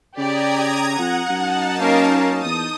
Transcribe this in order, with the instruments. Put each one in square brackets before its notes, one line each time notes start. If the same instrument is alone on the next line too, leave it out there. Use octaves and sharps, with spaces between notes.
[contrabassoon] C#3 [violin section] G4 D5 [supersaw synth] A#5 D#6 G#6
[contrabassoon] F2 [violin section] F#5
[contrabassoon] F#2 [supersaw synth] D#4 A5
[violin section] A#3 A#4 F5 [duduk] C#4
[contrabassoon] E2 [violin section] D#6 [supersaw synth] G6